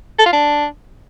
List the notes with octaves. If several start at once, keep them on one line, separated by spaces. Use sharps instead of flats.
A4
F4
D4